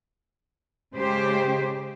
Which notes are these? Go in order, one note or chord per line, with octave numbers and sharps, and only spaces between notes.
C#3 G#3 G4 C5